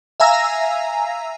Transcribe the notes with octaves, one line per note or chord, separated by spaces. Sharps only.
E5 F5 G#5 A#5 E6 A#6